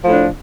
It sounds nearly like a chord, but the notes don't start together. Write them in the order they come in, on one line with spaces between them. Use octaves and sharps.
F3 A2 D4